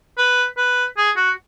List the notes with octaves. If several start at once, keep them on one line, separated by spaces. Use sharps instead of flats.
B4
B4
G#4
F#4